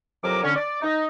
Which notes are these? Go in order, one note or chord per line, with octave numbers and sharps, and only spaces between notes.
C2 F2 F#3 A#4 D6
D3 C#4
D5
D#4